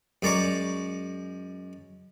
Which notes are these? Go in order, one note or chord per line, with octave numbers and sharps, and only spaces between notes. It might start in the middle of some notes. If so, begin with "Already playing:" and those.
F#2 G#3 D5 A#5 C#6 D6